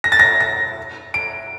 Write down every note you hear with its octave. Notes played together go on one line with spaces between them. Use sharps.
A#6
A6
A#6
A#6
D7